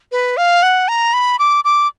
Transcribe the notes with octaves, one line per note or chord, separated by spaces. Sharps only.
B4
F5
F#5
A#5
B5
D6
D6